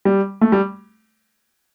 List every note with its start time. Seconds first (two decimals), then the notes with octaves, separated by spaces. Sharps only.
0.05 G3
0.41 A3
0.52 G3